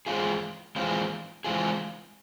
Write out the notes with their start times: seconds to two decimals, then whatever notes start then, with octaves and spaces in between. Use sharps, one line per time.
0.06 E3 G#3 C4 F4 G#4
0.76 E3 G#3 C4 F4 G#4
1.44 E3 G#3 C4 F4 G#4